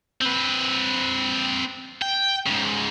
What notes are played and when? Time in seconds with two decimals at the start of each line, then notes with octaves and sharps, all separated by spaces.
0.21 C4 B4
2.02 G5
2.46 G#2 C#3